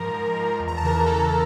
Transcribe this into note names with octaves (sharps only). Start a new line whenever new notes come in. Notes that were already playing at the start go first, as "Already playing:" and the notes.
Already playing: G#2 F3 A#4 A#5
G#2
F3
E2
A#5
A5
C#3 E3 A#4 A#5
E2 A4 A5